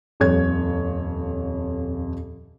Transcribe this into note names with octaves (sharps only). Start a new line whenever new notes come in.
D#1 F2 C#5 G#6